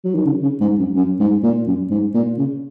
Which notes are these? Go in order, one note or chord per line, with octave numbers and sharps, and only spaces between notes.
F#3
D#3
C#3
C#3
G#2
F#2
F#2
G#2
A#2
F#2
G#2
A#2
C#3